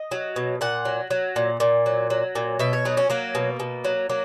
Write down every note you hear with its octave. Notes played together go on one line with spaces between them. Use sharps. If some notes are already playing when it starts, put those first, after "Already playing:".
Already playing: D#5
F#3
B2
A#2 F#5
F#3
F#3
A#2
A#2
F#3
F#3
A#2
B2 E5
C#5
F#3 D#4
C#4
F#3 A#3
B2
B2
F#3
F#3 A#3